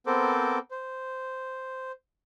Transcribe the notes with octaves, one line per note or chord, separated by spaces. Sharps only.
B3 C4 A4 A#4 C5 D6
C5